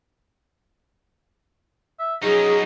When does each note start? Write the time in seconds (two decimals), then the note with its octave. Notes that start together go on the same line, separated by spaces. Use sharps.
1.99 E5
2.23 F#3 C#4 D#4 G#4